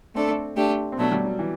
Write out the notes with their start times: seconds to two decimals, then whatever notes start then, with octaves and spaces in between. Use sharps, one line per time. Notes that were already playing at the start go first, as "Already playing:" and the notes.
0.15 A3 C4 D4 A4
0.56 A3 D4 G4
0.92 C4
0.98 B2 F#3 A3 B3 D4
1.12 G3
1.25 F#3
1.39 E3